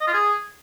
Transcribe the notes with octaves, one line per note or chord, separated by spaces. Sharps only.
D#5
F4
G#4